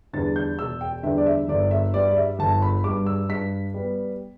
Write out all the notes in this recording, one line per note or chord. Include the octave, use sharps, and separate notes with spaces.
E2 D3 G3 A6
G6
E1 E6
G5
E2 D3 G3 E5
D5
E5
G1 D5
E5
G2 G3 D5
D5
E5
G1 A5
B5
G2 G3 D6
E6
G2 B6
G3 B3